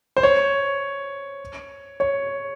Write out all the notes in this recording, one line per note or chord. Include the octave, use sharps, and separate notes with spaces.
C5
C#5
C#5